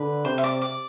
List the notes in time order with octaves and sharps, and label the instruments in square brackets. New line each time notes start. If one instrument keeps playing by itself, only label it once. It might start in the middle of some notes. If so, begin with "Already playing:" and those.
Already playing: [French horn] D3 [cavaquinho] B4
[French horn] C3 [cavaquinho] C5
[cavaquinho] E5
D5
D5